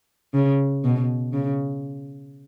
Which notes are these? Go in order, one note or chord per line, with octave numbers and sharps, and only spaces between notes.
C#3
B2
C#3